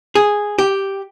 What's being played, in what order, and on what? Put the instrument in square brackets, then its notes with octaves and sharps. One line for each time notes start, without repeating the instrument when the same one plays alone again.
[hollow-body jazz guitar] G#4
G4